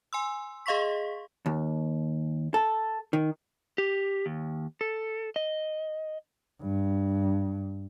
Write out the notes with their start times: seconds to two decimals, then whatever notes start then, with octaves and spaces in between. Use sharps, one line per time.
0.13 G#5 C6 E6
0.66 G#4 D#5 F5 C6 C#6 B6
1.46 D#2
2.54 A4
3.13 D#3
3.78 G4
4.26 D#2
4.81 A4
5.36 D#5
6.62 G2